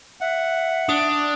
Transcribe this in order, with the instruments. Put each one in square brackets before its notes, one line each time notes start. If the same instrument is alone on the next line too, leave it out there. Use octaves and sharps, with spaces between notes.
[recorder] E5 [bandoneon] F#5
[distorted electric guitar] D4 [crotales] D#6